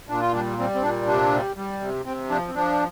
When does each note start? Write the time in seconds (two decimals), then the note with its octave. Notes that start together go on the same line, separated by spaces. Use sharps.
0.09 A#2 D4
0.20 F4
0.33 G3 D4
0.58 G3 C4
0.75 C4
0.83 A#2 D4
1.07 C3 D4
1.32 G3
1.56 G3
1.81 C3
2.05 C3 C4
2.30 F3 D4
2.48 C4
2.55 F3 D4